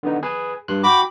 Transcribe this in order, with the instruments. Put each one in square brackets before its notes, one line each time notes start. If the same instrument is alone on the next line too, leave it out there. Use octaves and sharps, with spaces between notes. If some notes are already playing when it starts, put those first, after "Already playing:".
[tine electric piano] D3 B3 D#4
G#4 B4 G#5
G2 C6 F#6
[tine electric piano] F#4 G5 [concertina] B5 D6